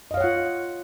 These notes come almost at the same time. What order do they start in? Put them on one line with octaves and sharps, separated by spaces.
D#5 F5 C#5 F#5 F4